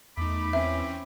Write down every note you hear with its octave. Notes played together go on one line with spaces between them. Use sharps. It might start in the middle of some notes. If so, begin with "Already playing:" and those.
E2 A3 D#4 B5 D6
E3 C4 C#4 E5